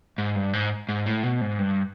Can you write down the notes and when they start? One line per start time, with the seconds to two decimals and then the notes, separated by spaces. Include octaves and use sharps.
0.18 G#2
0.35 G2
0.53 G#2
0.89 G#2
1.06 A2
1.23 B2
1.41 G#2
1.59 G2